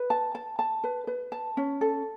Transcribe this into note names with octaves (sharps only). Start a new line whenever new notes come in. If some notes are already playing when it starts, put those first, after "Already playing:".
Already playing: B4
A5
A5
A5
B4
B4
A5
C#4
A4